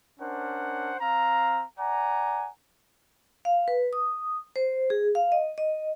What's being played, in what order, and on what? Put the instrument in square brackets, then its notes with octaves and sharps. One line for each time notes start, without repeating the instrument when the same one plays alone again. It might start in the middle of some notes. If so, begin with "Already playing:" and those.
[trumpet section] C#4 D4 A#4 C5 F#5
C4 F5 A#5
D5 F#5 G#5 A#5
[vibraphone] F5
B4
D#6
C5
G#4
F5
D#5
D#5